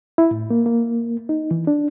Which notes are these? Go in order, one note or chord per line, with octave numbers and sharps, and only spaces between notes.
E4
A2
A#3
A#3
D#4
E3
D4